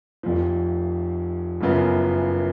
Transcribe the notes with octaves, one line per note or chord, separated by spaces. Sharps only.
F1 F2 F3
F#1 F#2 C#3 F3 B3